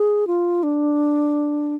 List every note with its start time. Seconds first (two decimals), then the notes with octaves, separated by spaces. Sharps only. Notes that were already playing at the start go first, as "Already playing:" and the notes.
Already playing: G#4
0.27 F4
0.63 D4